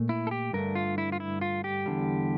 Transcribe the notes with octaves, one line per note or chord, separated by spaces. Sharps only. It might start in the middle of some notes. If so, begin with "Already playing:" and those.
Already playing: A#2 A3
E4
A4
G4
G2 D3 A3 A#4
F4
E4
F4
E4
F4
G4
E2 D3 G3